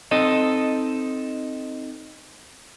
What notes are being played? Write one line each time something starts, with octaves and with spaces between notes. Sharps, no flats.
C4 D#4 A4 D#5